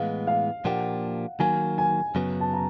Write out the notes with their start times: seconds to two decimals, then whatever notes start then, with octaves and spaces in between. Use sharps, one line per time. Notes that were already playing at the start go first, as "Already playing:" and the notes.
Already playing: A2 E3 G#3 B3 F5
0.27 F5
0.65 A#2 F3 A#3 D4 G4 F#5
1.40 D#3 F#3 A#3 G#5
1.78 G#5
2.15 F#2 C#3 F#3 B3
2.41 A5
2.53 A#5